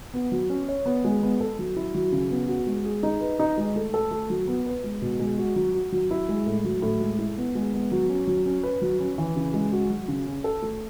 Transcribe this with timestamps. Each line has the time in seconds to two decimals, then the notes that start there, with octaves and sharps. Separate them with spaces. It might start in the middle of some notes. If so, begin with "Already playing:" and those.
0.14 B3
0.32 F#3
0.50 C#4
0.69 C#5
0.86 B3
1.04 G#3
1.23 B3
1.40 A4
1.59 F#3
1.76 E4
1.95 F#3
2.12 C#3
2.31 B3
2.48 F#4
2.67 G#3
2.85 G#4
3.03 D#4
3.21 B4
3.39 D#4
3.57 G#3
3.76 A3
3.94 A4
4.11 A3
4.30 F#3
4.48 B3
4.66 B4
4.84 G#3
5.01 B2
5.19 G#3
5.38 F#4
5.56 F#3
5.74 F#4
5.92 F#3
6.11 E4
6.29 G#3
6.46 A2
6.64 F#3
6.82 A2
7.01 G#3
7.19 E4
7.38 B3
7.55 G#3
7.73 B3
7.92 F#3
8.10 C#4
8.27 F#3
8.46 C#4
8.63 B4
8.82 F#3
9.00 C#4
9.18 E3
9.36 C#3
9.54 G#3
9.72 F#4
9.90 F#3
10.08 C#3
10.27 C#4
10.44 A4
10.62 A3